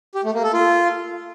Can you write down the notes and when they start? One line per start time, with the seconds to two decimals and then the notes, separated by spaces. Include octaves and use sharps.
0.15 G4
0.24 A3
0.34 A#3
0.44 A4
0.53 F4